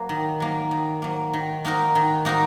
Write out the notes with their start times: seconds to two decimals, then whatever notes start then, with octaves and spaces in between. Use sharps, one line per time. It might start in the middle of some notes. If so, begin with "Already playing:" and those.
Already playing: F#3 A#3
0.09 D#3
0.40 F#3 A#3
0.71 D#3
1.02 F#3 A#3
1.33 D#3
1.65 A#3 D#4 F#4 A#4
1.95 D#3
2.25 A#3 D#4 F#4 A#4